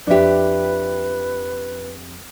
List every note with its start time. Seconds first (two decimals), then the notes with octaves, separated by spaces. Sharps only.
0.07 F2 D4 G4 B4 E5